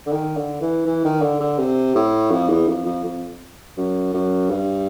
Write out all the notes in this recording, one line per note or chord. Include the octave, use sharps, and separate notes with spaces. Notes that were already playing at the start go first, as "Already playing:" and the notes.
D3
D#3
D3
E3
E3
D#3
D3
D3
C3
A2
F2
E2
F2
F2
F2
F#2
F#2
G2